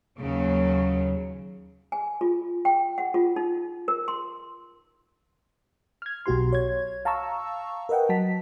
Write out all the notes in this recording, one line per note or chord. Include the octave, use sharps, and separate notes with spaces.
D#2 C#3 F#3
G#5
F4
G5
F#5
F4
D#4
A#4
C6
F6 G#6
B1 B2 F#4 G4 C6
C#5 G#6
F5 A5 A#5 C#6 E6
A#4 B4 D#5 F#5 G5
F#3 A5 B6